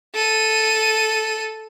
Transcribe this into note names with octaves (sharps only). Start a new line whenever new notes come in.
A4 D#7